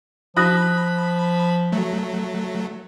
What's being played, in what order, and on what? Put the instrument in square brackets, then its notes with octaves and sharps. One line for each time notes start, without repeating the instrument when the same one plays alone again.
[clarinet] F3 [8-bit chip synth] B5 [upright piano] D#6 F#6 A#6
[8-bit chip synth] F#3 A3